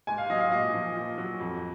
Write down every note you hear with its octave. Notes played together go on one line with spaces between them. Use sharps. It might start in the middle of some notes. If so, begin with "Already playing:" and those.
G#2 G#5
F5
F#3 D#5
F5
A#2 D#5
F3
A#2
F#3
F2